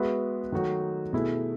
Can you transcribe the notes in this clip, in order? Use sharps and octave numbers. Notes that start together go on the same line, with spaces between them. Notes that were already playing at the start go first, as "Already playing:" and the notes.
Already playing: G#3 B3 F#4 B4 E5
D#3 F#3 A3 D#4 F#4
B2 A3 E4 G#4